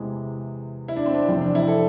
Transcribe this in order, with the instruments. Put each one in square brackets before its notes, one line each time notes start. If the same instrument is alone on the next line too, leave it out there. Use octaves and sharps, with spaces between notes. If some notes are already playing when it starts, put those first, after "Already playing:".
Already playing: [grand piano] E2 C3 E3 G#3
E4
D4
C4
D4
F1 E2 C3 F3 C4
D4
E4
A4